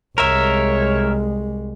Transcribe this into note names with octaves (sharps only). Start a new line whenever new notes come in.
C2 G#3 A#4 C#5 E5